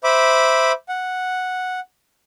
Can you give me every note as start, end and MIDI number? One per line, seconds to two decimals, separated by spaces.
0.04 0.72 72
0.04 0.72 76
0.04 0.72 83
0.04 0.72 86
0.89 1.80 78